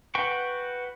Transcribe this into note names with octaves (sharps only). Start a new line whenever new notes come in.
F#4 B4 F#5 G5 C#6